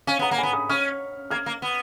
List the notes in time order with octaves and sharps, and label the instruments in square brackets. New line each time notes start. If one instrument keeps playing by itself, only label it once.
[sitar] C#4 [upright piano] F5 G#5
[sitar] B3 [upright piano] F#5 A#5
[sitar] A#3
[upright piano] G#5 B5
[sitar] B3
[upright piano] B5 D#6
[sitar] C#4 [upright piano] C#6 F6
[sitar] A#3 [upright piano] F6 G#6
[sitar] A#3
B3